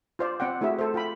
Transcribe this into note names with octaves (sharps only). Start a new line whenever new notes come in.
F4 C5 D5
C4 D5 F#5 G5
A3 E4 F#4 G#4 E5
A4 C5
F4 G5 B5